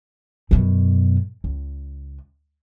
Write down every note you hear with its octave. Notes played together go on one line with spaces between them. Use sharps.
F#2 B2
C#2